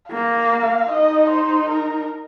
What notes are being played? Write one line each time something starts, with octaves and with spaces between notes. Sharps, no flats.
A#3 F5
D#4 D#5
C5
A#4